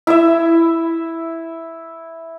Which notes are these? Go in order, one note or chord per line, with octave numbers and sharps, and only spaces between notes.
E4 E5